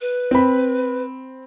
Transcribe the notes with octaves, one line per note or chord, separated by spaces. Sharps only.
B4
C4 B5